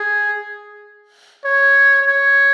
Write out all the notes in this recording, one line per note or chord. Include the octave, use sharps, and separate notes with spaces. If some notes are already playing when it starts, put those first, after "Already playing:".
Already playing: G#4
C#5
C#5